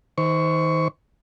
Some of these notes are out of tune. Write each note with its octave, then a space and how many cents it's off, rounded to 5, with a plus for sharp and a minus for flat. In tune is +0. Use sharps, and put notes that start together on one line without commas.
D#3 +35 C5 -20 C#6 +10